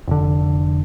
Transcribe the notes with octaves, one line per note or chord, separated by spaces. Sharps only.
F1 D3